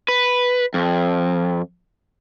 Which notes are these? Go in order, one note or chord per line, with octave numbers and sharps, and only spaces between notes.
B4
F2